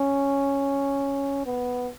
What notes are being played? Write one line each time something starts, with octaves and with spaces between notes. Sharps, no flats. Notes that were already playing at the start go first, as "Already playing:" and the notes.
Already playing: C#4
B3